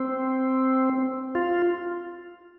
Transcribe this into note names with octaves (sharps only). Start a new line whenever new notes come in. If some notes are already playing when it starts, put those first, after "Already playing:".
Already playing: C4
F4